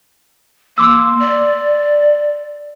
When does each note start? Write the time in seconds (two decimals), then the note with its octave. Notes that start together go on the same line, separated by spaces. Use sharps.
0.78 A#3 C6 D6 E6
1.20 D5